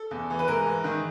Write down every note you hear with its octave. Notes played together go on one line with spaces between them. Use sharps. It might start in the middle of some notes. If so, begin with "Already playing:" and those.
Already playing: A4
E2
E3
B4
G#2 A#4
E3
D#3